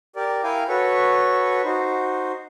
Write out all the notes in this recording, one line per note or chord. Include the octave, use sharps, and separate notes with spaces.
G4 A#4 D5
E4 A#4 F5 G5 G#5
F#4 A4 B4 C#5 C#6
D#4 F#4 C5